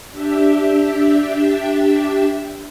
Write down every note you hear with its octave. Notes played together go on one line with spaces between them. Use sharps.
D4 G4 E5